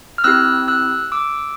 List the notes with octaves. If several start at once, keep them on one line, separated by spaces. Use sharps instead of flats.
F6
C4 E4 G4 E6 F#6
E6 F#6
D6 E6